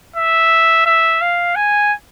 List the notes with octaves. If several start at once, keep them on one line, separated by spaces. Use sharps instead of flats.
E5
E5
F5
G#5